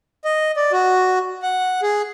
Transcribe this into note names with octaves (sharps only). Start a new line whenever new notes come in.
D#5
D5
F#4
F#5
G#4